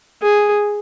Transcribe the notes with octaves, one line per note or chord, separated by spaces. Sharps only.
G#4